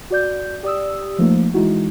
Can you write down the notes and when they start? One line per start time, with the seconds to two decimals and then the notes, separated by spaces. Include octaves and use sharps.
0.10 F#4 D5 G6
0.63 G4 D5 D#6 E6
1.19 F3 A3 A#3 D#4
1.54 E3 G#3 D#4 E4 F#4